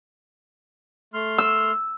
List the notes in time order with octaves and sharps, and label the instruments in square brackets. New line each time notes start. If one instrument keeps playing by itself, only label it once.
[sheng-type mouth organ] A3 C6 F6
[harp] E6